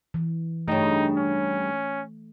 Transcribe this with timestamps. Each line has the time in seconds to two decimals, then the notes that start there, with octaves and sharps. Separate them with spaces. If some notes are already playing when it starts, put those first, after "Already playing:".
0.14 E3
0.68 G2 C#3 A3 D#4
1.17 C#4